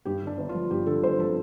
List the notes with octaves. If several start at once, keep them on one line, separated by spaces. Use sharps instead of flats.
G2 G4
D3
D4
G1
F4
F3
G2 G4
D3 A4
G1 C5
F3 A4